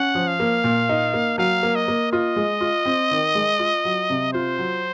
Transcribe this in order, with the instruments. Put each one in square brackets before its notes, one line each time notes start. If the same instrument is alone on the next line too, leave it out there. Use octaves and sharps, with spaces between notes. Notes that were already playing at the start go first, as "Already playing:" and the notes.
Already playing: [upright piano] C#4 [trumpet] F#5
[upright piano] F3
[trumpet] F5
[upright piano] A#3
A#2
D#4
A#3
[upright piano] F#3 [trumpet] F5
[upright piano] A#3
[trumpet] D#5
[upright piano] A#3
[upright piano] F4 [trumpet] D#5
[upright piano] G#3
F4
C4
D#3
G#3
F4
F#3
C3
[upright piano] F4 [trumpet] C5
[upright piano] F#3